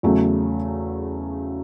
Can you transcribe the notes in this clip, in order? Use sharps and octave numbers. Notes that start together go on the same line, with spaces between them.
E2 C#3 F#3 A3